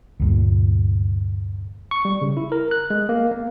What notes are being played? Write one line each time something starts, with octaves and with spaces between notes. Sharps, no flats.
D2 G2 A#2
C#6
G3
C#3
E4
A#4
F#6
G#3
A#3
A#3